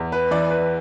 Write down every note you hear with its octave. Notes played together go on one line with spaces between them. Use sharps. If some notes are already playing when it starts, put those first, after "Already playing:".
Already playing: E2
B4
E3 D5
B4